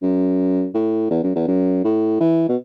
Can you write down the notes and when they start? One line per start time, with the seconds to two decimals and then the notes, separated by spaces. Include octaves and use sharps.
0.02 F#2
0.74 A2
1.11 E2
1.23 F#2
1.35 E2
1.47 F#2
1.84 A2
2.20 E3
2.49 B2